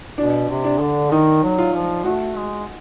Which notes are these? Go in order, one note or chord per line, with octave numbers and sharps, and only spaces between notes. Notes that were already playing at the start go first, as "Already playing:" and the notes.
B2 D4
C3
D4
D3
D#3 D#4
F#3
F4
F3
A3 F#4
G#3